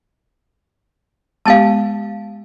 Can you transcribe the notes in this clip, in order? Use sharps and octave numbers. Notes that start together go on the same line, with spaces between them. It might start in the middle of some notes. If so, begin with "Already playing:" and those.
G#3 B3 G4 F5 G#5 A5